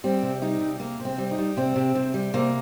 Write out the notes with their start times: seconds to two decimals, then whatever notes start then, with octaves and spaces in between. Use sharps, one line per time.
0.04 G3 C4
0.22 C3
0.42 G3 D#4
0.60 C3
0.80 C3 A#3
1.00 C3
1.05 C4
1.18 G3
1.31 D#4
1.38 G3
1.57 C3 C4
1.76 C3
1.95 C3
2.14 G3
2.34 C3 A#3